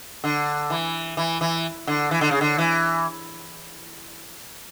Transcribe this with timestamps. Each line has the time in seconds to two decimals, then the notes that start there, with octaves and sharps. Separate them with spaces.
0.24 D3
0.70 E3
1.17 E3
1.41 E3
1.87 D3
2.11 E3
2.21 D3
2.31 C#3
2.41 D3
2.58 E3